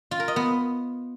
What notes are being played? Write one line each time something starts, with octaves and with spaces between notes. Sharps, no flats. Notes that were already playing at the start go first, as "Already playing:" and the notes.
F4
A#4
D#5
B3